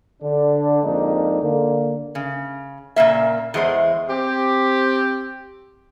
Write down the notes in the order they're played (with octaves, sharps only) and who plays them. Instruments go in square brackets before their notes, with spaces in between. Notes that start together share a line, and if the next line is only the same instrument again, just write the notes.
[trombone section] D3 D4
F2 G#2 A#3 D4 D#4
D3 A#3
[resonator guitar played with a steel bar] C#3
A#2 C#3 A#3 E5
E2 G#3 C5
[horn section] C4 G4